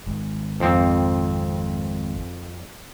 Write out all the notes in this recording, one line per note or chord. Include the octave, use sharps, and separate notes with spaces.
G#1
F2 C4